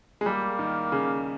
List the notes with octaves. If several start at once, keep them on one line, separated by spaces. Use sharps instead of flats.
G#3
G3 A#3
D#3
C#3